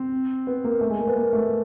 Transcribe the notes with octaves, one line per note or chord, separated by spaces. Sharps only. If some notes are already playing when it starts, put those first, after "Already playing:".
Already playing: C4
B3
A#3
A3
G#3
A#3
B3
A#3
A3